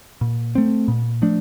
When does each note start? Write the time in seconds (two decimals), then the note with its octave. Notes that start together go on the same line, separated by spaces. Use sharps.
0.21 A#2
0.55 A3 C4
0.88 A#2
1.22 F3 A3 D4